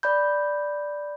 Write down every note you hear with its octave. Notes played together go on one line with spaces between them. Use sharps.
D5 B5 G6